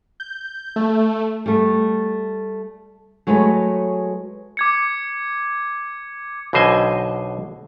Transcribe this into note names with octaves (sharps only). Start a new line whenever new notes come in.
G6
A3
G3 A3
F#3 G#3 A3 B4 C#5
D6 G#6 C#7
B1 B2 D3 C5 D#5 G#5